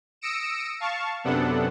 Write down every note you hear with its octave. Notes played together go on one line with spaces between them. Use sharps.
D#6 E6 A#6 C#7 D7 E7
F5 A5 C#6
F#2 C3 B3 D4 A4 F#5